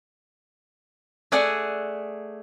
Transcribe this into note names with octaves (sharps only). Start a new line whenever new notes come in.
A3 G#4 D5 F#5 G#5